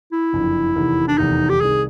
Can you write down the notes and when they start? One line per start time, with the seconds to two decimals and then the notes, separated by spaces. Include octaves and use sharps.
0.12 E4
0.33 F#1 F2 D3
0.75 F1 E2 C3 D#3
1.08 D4
1.18 F1 E2 C3 D#3 D#4
1.49 G4
1.60 C2 C3 D#3 G#4